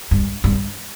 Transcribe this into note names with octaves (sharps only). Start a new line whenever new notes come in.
G2
G2